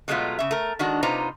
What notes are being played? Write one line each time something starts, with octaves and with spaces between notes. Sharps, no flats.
B2 F#3 G#3 A3 B3 F4
C#3 E5
A3 A#4
D#3 G#3 D4 F#4
C3 D#4 F4 B4 C5 A#5